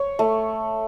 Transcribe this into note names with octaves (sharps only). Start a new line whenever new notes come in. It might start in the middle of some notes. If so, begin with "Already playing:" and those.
Already playing: C#5
A3